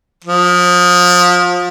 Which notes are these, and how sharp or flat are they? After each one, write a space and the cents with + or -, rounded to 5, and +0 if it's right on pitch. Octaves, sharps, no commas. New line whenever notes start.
F3 +30